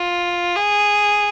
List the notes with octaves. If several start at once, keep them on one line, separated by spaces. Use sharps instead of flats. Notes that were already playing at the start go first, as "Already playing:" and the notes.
Already playing: F4
G#4